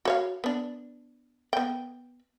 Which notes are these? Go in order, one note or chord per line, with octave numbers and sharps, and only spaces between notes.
F#4 C#5 F5
B3 D4
B3 G5